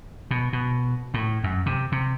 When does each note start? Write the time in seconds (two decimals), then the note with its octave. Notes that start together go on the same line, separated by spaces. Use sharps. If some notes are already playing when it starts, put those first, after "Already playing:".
0.31 B2
0.53 B2
1.14 A2
1.44 F#2
1.66 C3
1.92 C3